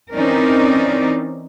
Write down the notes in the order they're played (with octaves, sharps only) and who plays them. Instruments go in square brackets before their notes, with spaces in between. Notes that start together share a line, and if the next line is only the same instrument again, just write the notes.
[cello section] E3 C4 C#4 D#4 A#4 D5